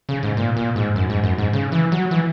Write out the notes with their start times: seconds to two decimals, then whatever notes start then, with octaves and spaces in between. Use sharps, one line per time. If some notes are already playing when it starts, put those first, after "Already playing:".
0.09 C#3
0.23 G#2
0.37 A#2
0.57 A#2
0.76 G#2
0.96 F#2
1.10 G#2
1.23 F#2
1.38 G#2
1.53 C#3
1.72 E3
1.92 F#3
2.11 E3